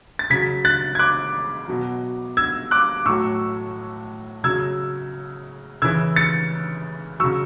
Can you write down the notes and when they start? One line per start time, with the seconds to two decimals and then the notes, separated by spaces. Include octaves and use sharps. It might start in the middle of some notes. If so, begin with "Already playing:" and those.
0.19 A6
0.30 C#3 F#3 G#6 B6
0.65 F#6 A6
0.95 G#6
0.99 D6 F#6
1.68 B2 F#3
2.37 E6 G#6
2.71 D6 F#6
3.06 A2 F#3 C#6 E6
4.43 C#3 F#3 E6 G#6
5.82 C#3 E3 E6 G#6
6.16 A6 C#7
7.20 C#3 F#3 C#6 E6